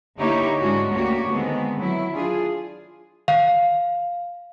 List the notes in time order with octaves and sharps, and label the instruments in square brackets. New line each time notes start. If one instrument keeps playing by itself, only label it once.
[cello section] D3 A#3 D#4 E4 G4 C#5
G#2 G#3 C#4 D4 F#4
D2 A#3 F#4 G4 C#5
D3 D#3 G#3 B3 C4
F#3 E4
D4 F4 G#4
[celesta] F5